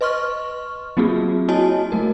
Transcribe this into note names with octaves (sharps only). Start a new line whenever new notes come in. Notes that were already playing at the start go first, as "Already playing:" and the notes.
B4 D#5 C6 C#6 F6
F#3 A#3 C4 F4 F#4 G#4
E4 F#4 C#5 D#5 G#5 A5
F#3 A3 A#4